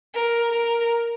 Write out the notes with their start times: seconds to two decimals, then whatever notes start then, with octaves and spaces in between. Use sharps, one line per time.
0.14 A#4
0.52 A#4